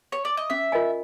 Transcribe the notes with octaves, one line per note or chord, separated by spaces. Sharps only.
C#5
D5
D#5
C#4 E5
F4 A#4 D#5 G#5